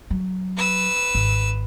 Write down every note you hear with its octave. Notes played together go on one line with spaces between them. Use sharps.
F#3
B4 E6
G#1